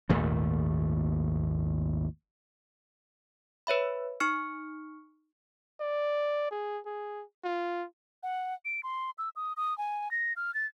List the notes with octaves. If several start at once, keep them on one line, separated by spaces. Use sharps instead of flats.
G#1 D#2 A#2 A3
B4 C#5 E5 B5
D#4 C#6 F6 C#7
D5
G#4
G#4
F4
F#5
D7
C6
E6
D#6
D#6
G#5
A#6
F6
A6